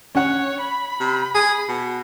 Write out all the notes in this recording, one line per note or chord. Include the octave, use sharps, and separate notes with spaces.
C#4 C#5 F#5
B5
C3
G#4
B2